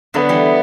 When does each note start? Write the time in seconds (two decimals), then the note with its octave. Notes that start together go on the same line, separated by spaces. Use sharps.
0.14 D3 F#3 B3
0.29 E3 G3